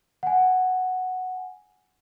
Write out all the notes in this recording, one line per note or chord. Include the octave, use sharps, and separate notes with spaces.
F#5 G#5